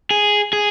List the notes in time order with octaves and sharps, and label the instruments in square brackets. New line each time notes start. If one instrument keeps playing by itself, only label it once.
[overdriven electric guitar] G#4
G#4